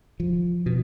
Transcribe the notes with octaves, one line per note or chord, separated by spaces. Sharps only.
F3
B2